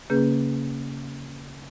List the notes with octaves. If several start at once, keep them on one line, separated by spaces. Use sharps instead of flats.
C#3 A#3 C#4 G#4 B4 G6